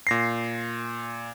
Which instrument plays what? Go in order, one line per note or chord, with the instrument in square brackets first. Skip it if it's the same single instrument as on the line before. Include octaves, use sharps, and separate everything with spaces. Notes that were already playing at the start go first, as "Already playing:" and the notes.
[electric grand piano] A#2 A#6 C7